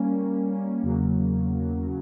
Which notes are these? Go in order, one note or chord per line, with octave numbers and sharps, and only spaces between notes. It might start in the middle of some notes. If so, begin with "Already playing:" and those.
Already playing: G3 A#3 C#4
E2 C#3 F#3 A#3
C#3 F#3